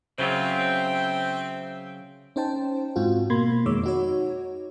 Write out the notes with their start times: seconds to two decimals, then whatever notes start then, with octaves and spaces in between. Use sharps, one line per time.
0.19 C#3 F#3 C4 F4 E5 G5
2.36 C#4 D#4 C5 G5 A5
2.96 G#2 C4 F4 F#4
3.30 B2 A#3 B5 C6 G#6
3.66 F2 D#3 G#3 C#5 D6 E6
3.83 D#4 F#4 C#5